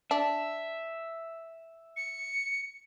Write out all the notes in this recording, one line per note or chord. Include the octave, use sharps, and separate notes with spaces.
D4 E5
C#7